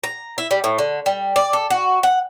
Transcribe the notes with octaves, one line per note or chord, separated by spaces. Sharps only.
A#5
E4
G3
A2
D3
G3
D5
A4
F#4
F#5